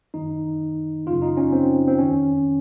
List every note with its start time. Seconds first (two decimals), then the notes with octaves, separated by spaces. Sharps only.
0.14 F#2 D#3 D#4
1.06 F#2 C#3 F4
1.22 D#4
1.37 C#4
1.52 C4
1.88 C4
1.98 F2 D#3 C#4